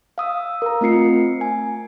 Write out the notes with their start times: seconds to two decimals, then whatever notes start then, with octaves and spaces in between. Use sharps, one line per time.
0.18 F5 D#6 E6
0.62 A#4 A#5
0.81 A3 C4 F4 C7 C#7
1.41 G#5